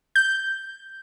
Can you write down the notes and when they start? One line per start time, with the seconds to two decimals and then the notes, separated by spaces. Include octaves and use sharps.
0.15 G6